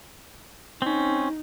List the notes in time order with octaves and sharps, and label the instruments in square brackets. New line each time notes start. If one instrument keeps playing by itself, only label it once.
[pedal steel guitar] C4 C#4 [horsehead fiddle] D#4